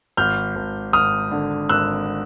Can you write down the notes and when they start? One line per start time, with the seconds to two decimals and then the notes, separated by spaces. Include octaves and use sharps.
0.17 G#1 F6 G6
0.56 G#1
0.93 G#1 D#6 F6
1.31 D3
1.69 G#1 E6 F#6